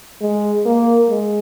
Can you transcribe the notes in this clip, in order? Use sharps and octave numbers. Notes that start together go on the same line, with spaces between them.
G#3
A#3
G#3